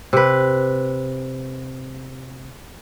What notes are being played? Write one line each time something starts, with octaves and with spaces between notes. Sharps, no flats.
C3 B4